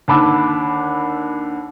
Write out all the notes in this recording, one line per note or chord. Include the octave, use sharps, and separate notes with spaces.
D#2 D3 A5 B5 D6 E6